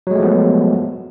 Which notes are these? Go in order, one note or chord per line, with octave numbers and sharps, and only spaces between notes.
F3 F#3 G#3 A3 B3